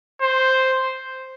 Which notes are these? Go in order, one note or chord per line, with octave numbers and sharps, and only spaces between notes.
C5